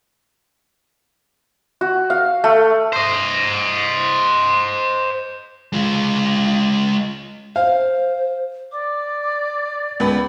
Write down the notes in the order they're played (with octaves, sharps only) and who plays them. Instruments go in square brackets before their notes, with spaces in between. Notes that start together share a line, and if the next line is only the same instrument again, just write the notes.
[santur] F#4
F5
A3
[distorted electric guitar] C5 D#5
[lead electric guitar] G#3 F4
[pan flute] C5 [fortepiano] F5
[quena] D5 [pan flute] D6
[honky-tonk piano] C#2 B3 B5